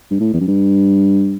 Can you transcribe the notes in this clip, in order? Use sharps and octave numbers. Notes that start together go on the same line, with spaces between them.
G2
A2
E2
F#2
G2